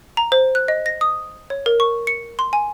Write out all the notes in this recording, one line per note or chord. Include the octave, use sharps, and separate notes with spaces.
A#5
C5
F#6
D#5
A#6
D#6
C#5
A#4
C#6
C#7
C6
G#5